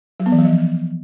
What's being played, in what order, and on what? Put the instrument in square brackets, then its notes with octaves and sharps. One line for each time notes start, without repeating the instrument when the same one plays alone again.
[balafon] F#3
B3
E3
F#3
F3